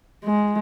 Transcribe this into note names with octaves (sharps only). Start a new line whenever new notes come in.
G#3